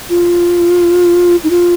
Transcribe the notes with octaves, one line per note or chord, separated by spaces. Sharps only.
F4
D#4
F4